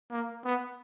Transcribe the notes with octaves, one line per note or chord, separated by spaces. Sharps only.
A#3
B3